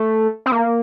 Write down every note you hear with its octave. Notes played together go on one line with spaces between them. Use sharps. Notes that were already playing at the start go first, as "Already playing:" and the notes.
Already playing: A3
C4
A#3